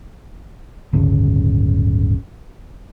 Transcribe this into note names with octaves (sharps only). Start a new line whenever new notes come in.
D1 G1 C#3